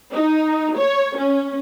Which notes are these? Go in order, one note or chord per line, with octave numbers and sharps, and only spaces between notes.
D#4
C#5
C#4